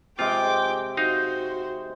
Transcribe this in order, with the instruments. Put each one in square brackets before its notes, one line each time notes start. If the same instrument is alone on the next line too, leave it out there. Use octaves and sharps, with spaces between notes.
[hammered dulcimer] C3 G#3 [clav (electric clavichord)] F4 [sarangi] G5 [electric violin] D6
[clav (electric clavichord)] D#4 F5 [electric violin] F#4 [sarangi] C5